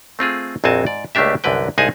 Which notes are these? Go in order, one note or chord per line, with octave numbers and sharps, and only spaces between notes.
A3 C4 F4 G#4
A#1 F2 C4 F#4 G#5 A5
G#2 D5
C#2 A3 A#3 D4 G4 E5
C2 F#2 D3 B4 G5
C2 G#3 D#4 G#4 G#5 A5